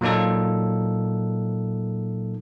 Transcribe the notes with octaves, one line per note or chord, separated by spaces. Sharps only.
A#2 F#3 A#3 D#4 A4